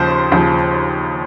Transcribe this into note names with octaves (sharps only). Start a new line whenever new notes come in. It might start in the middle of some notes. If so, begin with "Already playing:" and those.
Already playing: D#2 C#3 F3 C5
D#2 C#3 F3